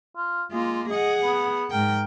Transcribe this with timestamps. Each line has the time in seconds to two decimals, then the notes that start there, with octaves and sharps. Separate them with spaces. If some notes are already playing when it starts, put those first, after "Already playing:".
0.16 F4
0.52 G#3 A#3 F4
0.90 G#4 D#5 F#5
1.23 B3
1.71 G#2 A#4 G5